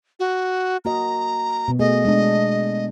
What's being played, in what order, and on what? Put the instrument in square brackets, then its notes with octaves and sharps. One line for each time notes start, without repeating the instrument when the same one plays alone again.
[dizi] F#4
[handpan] A#3 F#4 D#5 [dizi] A#5
[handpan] B2 B3
[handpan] A3 G#4 [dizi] D#5
[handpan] G#3 D4